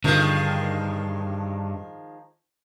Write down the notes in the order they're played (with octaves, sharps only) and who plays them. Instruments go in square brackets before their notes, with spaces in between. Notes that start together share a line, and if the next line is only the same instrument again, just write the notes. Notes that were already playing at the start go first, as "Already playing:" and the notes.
[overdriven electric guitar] G2 [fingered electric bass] D3 [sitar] D#3 F3 G#3